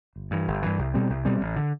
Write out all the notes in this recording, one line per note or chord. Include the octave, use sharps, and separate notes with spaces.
G1
G2 E3
G1
G2 E3
C2
B2 G3 C4
C2
B2 G3 C4
A1
D3